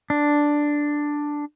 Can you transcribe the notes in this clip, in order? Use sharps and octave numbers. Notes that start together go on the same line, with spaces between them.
D4